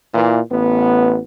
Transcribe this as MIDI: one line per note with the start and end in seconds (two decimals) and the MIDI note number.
0.14 0.39 46
0.14 0.39 52
0.51 1.19 33
0.51 1.19 59